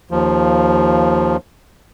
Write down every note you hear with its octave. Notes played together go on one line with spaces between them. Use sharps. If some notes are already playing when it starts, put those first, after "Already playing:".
D#2 F3